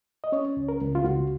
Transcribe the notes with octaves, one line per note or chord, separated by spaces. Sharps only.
D#5
C#4 C#5
C#2
A#4
C#2
F4
C#2 F#4